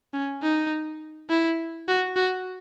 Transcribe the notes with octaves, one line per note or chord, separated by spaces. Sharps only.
C#4
D#4
E4
F#4
F#4